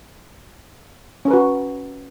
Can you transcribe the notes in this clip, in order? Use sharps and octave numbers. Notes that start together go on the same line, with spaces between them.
C#4 F#4 A#4 B4